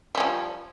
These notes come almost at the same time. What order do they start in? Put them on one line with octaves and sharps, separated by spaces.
G3 C#4 F3